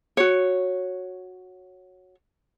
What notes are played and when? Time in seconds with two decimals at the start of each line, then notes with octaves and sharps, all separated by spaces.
0.17 F#4 C#5